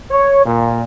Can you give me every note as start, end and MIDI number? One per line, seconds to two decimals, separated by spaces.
0.11 0.40 73
0.45 0.83 46